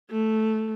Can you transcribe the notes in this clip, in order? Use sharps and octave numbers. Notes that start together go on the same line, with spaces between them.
A3